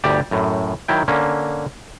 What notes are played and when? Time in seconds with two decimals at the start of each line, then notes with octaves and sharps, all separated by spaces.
0.04 G1 D2 G4 D5 A5
0.31 F#2 A2
0.88 D#3 F#3 E4 G5
1.08 D3 A#3 C#4